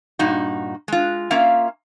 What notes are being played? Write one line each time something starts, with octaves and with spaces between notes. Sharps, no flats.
G2 A#2 D#4 F#4
G#3 F4
A#3 C#4 F4 E5 F5